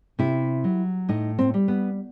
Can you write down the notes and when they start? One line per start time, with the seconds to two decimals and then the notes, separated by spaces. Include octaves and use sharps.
0.19 C3 E4
0.64 F#3
1.09 A2 D#4
1.38 C4
1.54 G3
1.68 B3